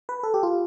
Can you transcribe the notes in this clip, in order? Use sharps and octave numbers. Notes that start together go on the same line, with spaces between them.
B4
A4
G4
F4